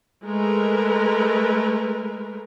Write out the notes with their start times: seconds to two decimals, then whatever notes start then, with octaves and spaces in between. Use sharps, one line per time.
0.24 G#3 A3 A#4 B4